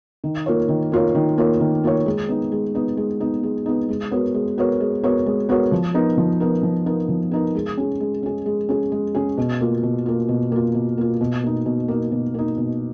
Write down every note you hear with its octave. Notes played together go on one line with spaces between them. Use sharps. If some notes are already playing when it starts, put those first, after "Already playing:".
D#3
A#3 F4 A#4 C#5
D#3
A#3 F4 A#4 C#5
D#3
A#3 F4 A#4 C#5
D#3
A#3 F4 A#4 C#5
G#3
B3 D#4
G#3
B3 D#4
G#3
B3 D#4
G#3
B3 D#4
G#3
B3 F#4 A#4 C#5
G#3
B3 F#4 A#4 C#5
G#3
B3 F#4 A#4 C#5
G#3
B3 F#4 A#4 C#5
F3
B3 D#4 A#4
F3
B3 D#4 A#4
F3
B3 D#4 A#4
F3
B3 D#4 A#4
G#3
C#4 G#4
G#3
C#4 G#4
G#3
C#4 G#4
G#3
C#4 G#4
B2
A#3 F4
B2
A#3 F4
B2
A#3 F4
B2
A#3 F4
B2
A#3 D#4
B2
A#3 D#4
B2
A#3 D#4
B2